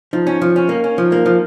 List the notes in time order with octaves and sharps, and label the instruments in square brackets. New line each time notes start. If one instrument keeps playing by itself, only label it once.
[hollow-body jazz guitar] F3 [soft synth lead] D#4
[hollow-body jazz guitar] C#4
F3
C#4
A#3
C#4
F3
A#3
F3